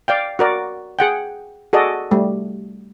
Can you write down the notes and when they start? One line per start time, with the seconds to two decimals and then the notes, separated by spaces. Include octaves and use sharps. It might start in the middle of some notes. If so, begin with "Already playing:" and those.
0.08 D5 F5 G5
0.39 F#4 A#4 D5
0.99 G#4 F#5 G5
1.73 F#4 G#4 A4 D5 D#5
2.11 G3 A3